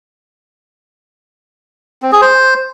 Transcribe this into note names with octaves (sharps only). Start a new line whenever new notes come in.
C4
G#4
C5